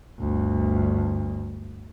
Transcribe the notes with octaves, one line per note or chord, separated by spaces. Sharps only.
G1 D2